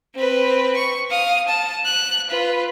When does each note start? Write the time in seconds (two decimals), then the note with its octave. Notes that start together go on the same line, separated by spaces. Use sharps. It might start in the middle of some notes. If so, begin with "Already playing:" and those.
0.15 C4 B4
0.76 C#6
1.10 F5 D#6
1.48 A5
1.86 F#6
2.29 F4 B4